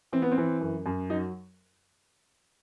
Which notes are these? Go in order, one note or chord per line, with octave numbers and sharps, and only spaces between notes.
E3 C4
B3
C4
E3
F#2
F#2
F#3 D#4